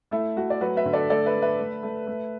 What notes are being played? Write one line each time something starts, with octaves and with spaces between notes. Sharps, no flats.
A3 E4 A4
A3 F#4
D5
F#3 F#4 B4
B4 E5
D3
A4 D5
A3 A4 D5
B4 E5
A3
B4 E5
A3
A3
A3